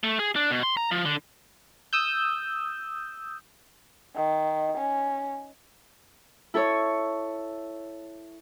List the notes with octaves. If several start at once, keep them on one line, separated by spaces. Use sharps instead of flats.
A3
G#4
D4
B2
C6
A#5
F3
D3
D#6 E6 G6
D#3
C#4
E4 A4 C#5 C#6